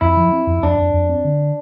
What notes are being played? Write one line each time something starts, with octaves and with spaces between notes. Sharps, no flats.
F2 E4
F3
C4
F2
F2 D4
F2
F2
C4
D3